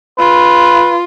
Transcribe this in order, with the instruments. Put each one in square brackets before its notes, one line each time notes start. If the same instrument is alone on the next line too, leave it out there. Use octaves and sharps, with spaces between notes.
[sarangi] F4 [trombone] B4